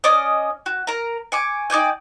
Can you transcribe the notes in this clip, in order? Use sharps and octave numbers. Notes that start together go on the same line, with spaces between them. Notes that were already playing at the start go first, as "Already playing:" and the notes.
C#4 D5 D#5
F#4
A#4 A#5
G#5 C#6 D6
D#4 D5 G5 G#5